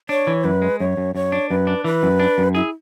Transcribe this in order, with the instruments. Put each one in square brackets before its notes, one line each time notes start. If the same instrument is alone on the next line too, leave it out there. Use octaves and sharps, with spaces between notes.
[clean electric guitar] D4 [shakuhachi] C#5
[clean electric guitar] E3
[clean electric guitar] F#2 [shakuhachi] B4
[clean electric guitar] G#3
[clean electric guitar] F#2 [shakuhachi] C#5
[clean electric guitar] F#2
[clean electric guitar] F#2 [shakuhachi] C#5
[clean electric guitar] D4
[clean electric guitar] F#2 [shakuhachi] B4
[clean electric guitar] D4
[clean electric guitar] E3 [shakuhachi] B4
[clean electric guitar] F#2
D4
F#2
[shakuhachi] E4 [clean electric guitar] G#4